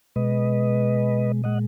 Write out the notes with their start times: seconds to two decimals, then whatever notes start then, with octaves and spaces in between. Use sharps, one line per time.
0.16 B2 G#3 B4 D#5
1.44 A#2 G#3 D#5 F#5